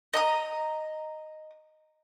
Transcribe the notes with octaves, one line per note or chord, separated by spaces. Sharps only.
D#5 A#5 D#6